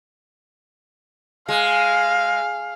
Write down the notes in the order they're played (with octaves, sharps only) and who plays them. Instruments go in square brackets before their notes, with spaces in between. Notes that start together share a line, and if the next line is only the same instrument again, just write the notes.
[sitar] G#3 [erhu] F5